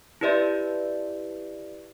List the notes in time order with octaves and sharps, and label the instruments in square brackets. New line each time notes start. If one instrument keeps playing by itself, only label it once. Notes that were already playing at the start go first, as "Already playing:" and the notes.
[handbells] E4 G4 B4 D5 E5 C6